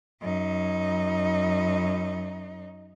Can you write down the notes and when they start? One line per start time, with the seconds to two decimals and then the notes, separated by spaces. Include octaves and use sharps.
0.22 F#2 D#4